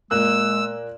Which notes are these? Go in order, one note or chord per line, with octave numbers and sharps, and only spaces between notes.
A#2 G#3 A#3 E6 F#6